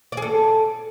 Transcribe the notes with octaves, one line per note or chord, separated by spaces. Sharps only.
D5
G#4
A4